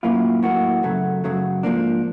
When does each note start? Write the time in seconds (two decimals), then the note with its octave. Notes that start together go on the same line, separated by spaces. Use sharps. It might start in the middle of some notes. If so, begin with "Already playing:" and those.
0.03 A2 F#3 A#3 C#4 E4 F4
0.43 A2 F#3 A#3 C#4 E4 F#4
0.83 F#2 C#3 F#3 A3
1.24 F#2 C#3 F#3 A3
1.63 G#2 F3 A#3 D4